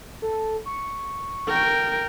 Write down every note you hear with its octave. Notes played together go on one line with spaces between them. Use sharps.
A4
C#6
A#4 G5